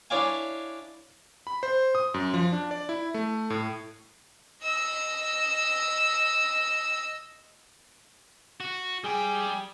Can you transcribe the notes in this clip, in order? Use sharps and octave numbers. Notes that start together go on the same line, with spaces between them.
D4 E4 C#5 D5 F5 G#5
B5
C5
D#6
F#2
F3
D4
D5
E4
A3
A2
D#5 E6
F#4
G3 G#4 G5 D#6